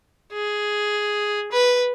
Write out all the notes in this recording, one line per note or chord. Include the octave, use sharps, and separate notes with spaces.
G#4
B4